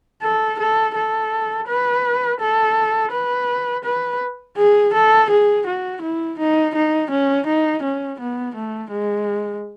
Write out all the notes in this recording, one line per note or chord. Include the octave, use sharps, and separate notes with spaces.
A4
A4
A4
B4
A4
B4
B4
G#4
A4
G#4
F#4
E4
D#4
D#4
C#4
D#4
C#4
B3
A3
G#3